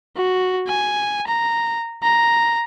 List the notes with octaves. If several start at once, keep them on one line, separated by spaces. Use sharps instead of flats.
F#4
G#5
A#5
A#5